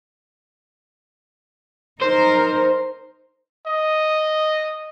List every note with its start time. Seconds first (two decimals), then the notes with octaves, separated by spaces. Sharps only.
2.02 D#4 A#4 C5
3.66 D#5